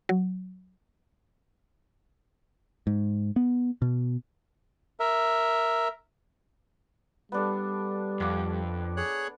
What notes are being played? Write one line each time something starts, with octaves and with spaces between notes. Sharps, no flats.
F#3
G#2
B3
B2
A#4 E5
G3 B3 D4 A4
F2 F#5 D6
G#4 C#5 F#6